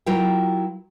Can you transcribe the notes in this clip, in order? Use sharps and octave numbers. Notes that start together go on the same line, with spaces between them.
F#3 E4 F4 A#4 G5